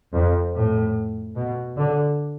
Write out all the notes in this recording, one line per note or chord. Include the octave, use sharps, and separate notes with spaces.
F2
A2
B2
D3